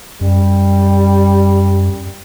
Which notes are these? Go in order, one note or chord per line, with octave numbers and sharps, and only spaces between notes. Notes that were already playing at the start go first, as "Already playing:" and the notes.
F#2 G3